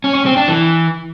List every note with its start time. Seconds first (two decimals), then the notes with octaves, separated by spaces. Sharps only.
0.04 C#4
0.15 C#4
0.26 C4
0.37 D4
0.48 E3